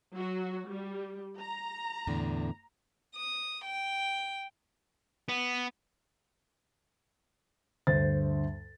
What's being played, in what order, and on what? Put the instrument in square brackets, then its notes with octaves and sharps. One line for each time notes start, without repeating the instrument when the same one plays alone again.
[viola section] F#3 F#4
G3
A#5
[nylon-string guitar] E2 A2 D3
[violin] D#6
G5
[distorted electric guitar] B3
[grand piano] D2 G2 C5 A6